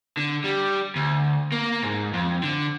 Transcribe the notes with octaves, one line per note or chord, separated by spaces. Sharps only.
D3
G3
D2
A#3
G#2
F2
D3